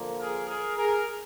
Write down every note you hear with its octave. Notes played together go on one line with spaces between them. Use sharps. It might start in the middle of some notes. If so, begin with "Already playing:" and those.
Already playing: D3 F3 A#3
G#4 A#4
G#4 A#4
G#4 A#4